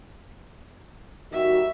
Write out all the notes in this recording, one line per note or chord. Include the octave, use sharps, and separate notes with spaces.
D#3 G3 F#4 E5